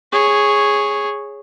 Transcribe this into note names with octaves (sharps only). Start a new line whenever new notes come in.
G#4 C#5